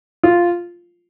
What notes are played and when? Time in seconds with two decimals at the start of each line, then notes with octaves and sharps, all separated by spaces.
0.23 F4